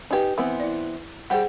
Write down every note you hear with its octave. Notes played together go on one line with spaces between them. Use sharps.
D#4 G4 B4 G#5
E3 B3 C4
E4 D5
G3 G4 G#4 C5 F#5